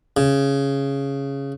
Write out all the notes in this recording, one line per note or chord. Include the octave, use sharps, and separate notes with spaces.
C#3